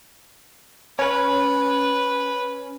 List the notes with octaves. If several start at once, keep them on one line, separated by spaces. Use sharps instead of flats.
C#4 B4 C#5